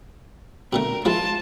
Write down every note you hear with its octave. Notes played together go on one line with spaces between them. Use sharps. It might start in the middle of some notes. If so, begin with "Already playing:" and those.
B2 D3 A3 A#4
F3 G#3 E4 F4 A5